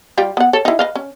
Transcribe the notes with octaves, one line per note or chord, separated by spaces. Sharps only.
G3 F4 G4
B3 F#5
A4 C#5
D#4 E4
B4 D#5 F5
C#4